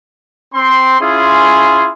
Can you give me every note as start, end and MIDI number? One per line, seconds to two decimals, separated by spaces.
0.54 0.96 60
0.54 0.96 84
1.00 1.89 61
1.00 1.89 64
1.00 1.89 65
1.00 1.89 68
1.00 1.89 84